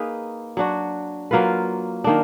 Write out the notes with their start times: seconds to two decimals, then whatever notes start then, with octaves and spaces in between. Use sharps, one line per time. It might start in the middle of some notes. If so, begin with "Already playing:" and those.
Already playing: A#3 D#4 G#4 B4
0.57 F#3 D4 F#4
1.31 F#3 A#3 F4 B4
2.04 D#3 A#3 D4